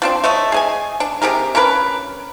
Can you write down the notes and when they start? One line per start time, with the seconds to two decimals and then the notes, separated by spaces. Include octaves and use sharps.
0.02 F3 C4 D4
0.24 A3 C#5 D#5
0.52 G#4 D#5 G#5
1.00 D4
1.22 C3 G4 G#4 A#4
1.55 C#4 D4 A#4 B4